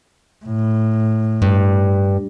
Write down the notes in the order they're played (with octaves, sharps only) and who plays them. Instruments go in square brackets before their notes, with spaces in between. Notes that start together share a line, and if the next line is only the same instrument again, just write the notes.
[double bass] A2
[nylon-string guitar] G2